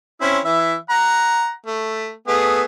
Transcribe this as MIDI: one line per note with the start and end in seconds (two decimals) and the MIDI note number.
0.21 0.39 60
0.21 0.39 61
0.21 0.39 64
0.45 0.74 52
0.45 0.74 76
0.90 1.51 78
0.90 1.51 82
1.66 2.11 57
2.28 2.63 57
2.28 2.63 59
2.28 2.63 68